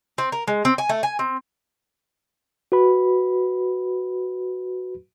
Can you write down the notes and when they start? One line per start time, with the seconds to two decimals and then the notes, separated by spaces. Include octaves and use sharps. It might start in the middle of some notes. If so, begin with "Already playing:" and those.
0.18 C4
0.32 A#4
0.48 G#3
0.65 C4
0.78 G#5
0.89 A3
1.03 G#5
1.19 C4
2.72 F#4 B4 B5